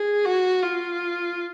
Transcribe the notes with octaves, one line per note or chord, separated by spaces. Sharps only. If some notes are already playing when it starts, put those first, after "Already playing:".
Already playing: G#4
F#4
F4